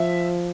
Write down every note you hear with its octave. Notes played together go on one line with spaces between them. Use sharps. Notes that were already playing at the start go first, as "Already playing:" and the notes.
Already playing: F3 E5